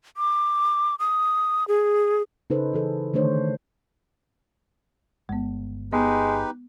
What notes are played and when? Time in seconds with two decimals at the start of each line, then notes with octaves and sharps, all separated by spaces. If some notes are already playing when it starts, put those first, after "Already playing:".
0.17 D6
0.99 D#6
1.68 G#4
2.50 C#3 D#4 A4 B4 C5
2.73 E3 G#4 A4
3.14 D3 D#3 A3 D4 C5 C#5
5.29 G1 G#3 B3
5.92 G#3 B3 D#4 G4 B4